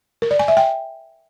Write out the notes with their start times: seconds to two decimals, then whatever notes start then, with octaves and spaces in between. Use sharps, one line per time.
0.22 A#4
0.31 D5
0.39 G#5
0.48 E5
0.57 G5